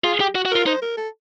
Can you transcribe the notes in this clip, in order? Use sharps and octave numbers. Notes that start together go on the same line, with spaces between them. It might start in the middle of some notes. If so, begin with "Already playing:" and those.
F4 G#4
G4
F#4
F#4
F4 A#4
D#4 C5
A#4
A4